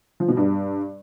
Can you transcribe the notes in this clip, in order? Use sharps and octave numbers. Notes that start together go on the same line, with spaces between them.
F3
B2
G2